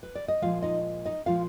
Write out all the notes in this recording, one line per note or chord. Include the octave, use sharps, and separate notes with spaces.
B4
D5
D#5
A#2 F3 G#3 F4 F5
D#4 D#5
D#4 D#5
A#2 F3 G#3 F4 F5